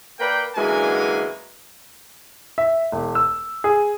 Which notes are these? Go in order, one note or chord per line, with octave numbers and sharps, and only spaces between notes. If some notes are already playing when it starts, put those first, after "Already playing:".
A#3 A#4 B4 D5 G5
F#2 D3 E3 G#3 A#3 G#5
E5
E1
E6
G#4